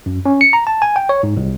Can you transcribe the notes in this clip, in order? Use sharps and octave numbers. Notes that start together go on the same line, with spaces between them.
F#2
C#4
C#7
A#5
A5
G#5
G5
C#5
G#2
C2